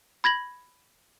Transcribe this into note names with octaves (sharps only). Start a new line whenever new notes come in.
B5 G#6 A#6 F#7